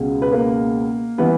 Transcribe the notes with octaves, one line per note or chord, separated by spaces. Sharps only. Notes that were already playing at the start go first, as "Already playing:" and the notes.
Already playing: C#2 B2 G#3
B4
A#3 A#4
E3 G3 B3 B4